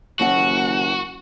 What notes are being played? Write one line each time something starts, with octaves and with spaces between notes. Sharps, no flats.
F#1 D#2 E3 F#4 F#5